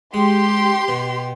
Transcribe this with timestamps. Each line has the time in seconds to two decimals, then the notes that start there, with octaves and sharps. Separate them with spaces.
0.14 G#3 G4 C6
0.88 B2